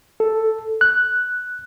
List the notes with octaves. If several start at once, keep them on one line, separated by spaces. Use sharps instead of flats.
A4
F#6